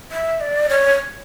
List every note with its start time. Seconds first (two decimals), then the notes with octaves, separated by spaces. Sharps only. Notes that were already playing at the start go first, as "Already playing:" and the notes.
0.12 E5
0.41 D5
0.69 C#5